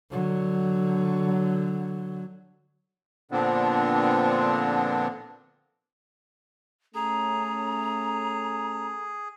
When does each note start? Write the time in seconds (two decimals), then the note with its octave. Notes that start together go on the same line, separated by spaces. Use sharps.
0.12 D3 F#3
3.31 A#2 D3 F3 B3 C4 D4
6.95 A3 C#4 G#4 A4 A#5